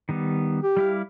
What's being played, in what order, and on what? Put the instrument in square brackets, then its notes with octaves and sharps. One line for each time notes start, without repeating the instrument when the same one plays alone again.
[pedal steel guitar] D#3 G3 B3
[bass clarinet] G4
[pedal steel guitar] G3 E4 F5